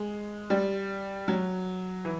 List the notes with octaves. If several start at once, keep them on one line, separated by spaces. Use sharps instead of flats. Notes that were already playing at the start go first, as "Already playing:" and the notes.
Already playing: G#3
G3
F#3
E3